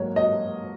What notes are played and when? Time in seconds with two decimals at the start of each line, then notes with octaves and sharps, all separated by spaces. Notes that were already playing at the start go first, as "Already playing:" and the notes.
Already playing: G#2 F#3 A#3 C#5
0.16 D#5